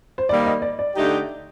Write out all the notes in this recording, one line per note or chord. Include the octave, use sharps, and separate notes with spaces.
C5
D#3 G3 A#3 D5
D#5
D5
D5
D3 A3 D#4 G4